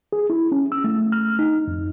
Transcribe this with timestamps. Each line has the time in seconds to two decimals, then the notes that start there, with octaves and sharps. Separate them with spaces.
0.13 G#4
0.30 E4
0.52 C#4
0.72 E6
0.84 A3
1.12 F6
1.39 D#4
1.68 F2